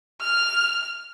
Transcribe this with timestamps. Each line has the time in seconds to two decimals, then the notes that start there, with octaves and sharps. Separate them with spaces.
0.21 F6